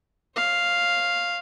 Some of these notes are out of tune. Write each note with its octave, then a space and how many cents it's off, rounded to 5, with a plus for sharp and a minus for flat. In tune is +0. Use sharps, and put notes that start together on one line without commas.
C#5 -35 F5 +0